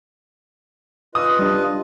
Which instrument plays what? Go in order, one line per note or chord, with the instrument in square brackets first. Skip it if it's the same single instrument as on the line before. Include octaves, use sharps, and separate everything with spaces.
[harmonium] F4 B4 D#5 [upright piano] D#6
[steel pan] G3 D4